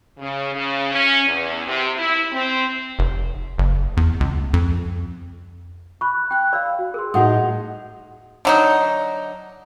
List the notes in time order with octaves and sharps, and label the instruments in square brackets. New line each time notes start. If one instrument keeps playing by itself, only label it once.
[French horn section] C#3
C#3
C#4
E2
C3
E4
C4
[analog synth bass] F1
F#1
E2
C#2
F2
[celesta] B5 F#6 [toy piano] C#6
[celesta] G5 F#6
[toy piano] D5 B5 [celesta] F5 E6
[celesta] F#4
[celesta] G#4 C6 [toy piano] A#4
[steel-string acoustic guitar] A2 D#4 [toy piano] F#4 F#5 D#6
[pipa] D3 F#3 D#4